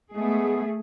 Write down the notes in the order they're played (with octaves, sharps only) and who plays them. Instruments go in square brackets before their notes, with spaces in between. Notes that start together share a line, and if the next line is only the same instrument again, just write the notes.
[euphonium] G#3 [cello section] A3 G#4 [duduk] B3